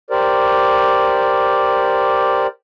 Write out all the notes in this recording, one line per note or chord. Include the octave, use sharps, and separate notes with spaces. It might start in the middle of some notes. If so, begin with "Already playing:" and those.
G4 A#4 C5 D5